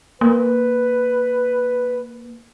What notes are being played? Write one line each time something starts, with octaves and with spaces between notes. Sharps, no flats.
A#3 B4